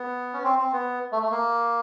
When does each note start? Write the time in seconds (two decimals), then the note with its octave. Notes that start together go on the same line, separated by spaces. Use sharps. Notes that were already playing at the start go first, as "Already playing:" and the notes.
Already playing: B3
0.33 C#4
0.44 C4
0.59 C4
0.73 B3
1.12 A3
1.23 A3
1.32 A#3